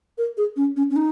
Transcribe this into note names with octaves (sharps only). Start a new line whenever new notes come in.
A#4
G#4
C#4
C#4
C#4
D#4